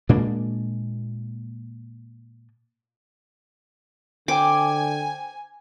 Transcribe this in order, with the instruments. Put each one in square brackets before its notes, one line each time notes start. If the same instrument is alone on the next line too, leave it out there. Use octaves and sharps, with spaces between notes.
[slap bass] A#2 G#3 A#3 D4
[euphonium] D3 [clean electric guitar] C5 G5 [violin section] G#5 [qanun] D6